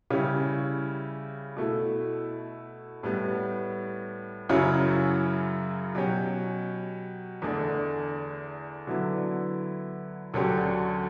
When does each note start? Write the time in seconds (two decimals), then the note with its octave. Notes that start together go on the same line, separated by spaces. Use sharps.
0.10 C#3 G3 C#4 E4 G4
1.56 B2 A3 E4
3.03 A2 G3 B3
4.49 F#2 C#3 F#3 C#4 E4
5.95 B2 F#3 C#4 G4
7.42 E2 D3 A3 D4
8.87 D3 F#3 B3 E4
10.34 D2 D3 F#3 C#4 G4